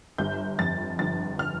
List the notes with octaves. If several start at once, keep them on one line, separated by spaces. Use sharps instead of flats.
G1 G6
F2 A6
G1 A6
F6